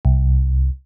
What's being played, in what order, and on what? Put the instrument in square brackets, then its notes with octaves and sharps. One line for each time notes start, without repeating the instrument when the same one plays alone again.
[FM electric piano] C2